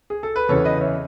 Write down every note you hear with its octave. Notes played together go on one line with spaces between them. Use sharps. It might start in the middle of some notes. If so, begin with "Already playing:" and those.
G#4
A4
B4
E2 C#3 E3 A4 C#5
B4 D#5
C#5 E5